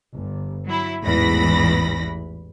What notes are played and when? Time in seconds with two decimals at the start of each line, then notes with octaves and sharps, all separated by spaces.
0.12 G1
0.66 F#3 E4
1.02 A1 E2 G#2 E3 B5 A#6